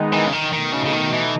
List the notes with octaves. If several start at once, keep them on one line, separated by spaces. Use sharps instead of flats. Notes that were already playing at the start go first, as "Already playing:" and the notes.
Already playing: D#3 G#3 B3 D#4
E3
C#3
D#3
B2 D#3 A3 D#4
C#3
C#3
D#3
E3